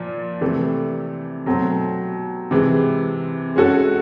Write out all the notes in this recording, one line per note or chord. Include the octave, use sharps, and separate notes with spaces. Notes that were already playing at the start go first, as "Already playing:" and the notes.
Already playing: A#2 F3
C3 E3 A3
B2 F#3 A3 C4
C3 E3 G#3
G#3 C#4 F#4 A4